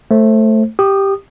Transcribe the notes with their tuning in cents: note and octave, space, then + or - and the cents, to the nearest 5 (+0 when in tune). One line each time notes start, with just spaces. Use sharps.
A3 +0 C5 +20
G4 +0 D#6 -25